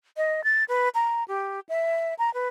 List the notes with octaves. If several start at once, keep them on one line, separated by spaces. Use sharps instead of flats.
D#5
A6
B4
A#5
G4
E5
A#5
B4